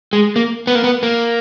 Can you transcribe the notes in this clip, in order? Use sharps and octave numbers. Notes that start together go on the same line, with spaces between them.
G#3
A#3
B3
A#3
B3
A#3